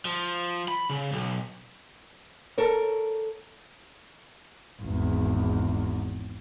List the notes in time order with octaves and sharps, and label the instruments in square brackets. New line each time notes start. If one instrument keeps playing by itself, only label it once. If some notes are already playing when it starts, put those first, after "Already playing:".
[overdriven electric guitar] F3
B5
C#3
B1
[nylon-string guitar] A4 A#4 C#5
[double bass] G#1 E2